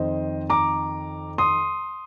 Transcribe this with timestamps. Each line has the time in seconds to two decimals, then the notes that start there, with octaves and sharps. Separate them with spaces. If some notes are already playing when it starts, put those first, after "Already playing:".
Already playing: F2 D#3 C5 D#5
0.50 A#5 D6
1.38 C6 D#6